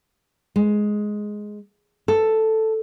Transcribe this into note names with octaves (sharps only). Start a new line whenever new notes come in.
G#3
A4